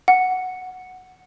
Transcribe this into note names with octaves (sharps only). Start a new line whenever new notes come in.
F#5